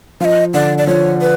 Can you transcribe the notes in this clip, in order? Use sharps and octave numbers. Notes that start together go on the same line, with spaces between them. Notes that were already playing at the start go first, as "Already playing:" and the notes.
F3 D#5 F5
D3 D5
D5
F3 C#5
B4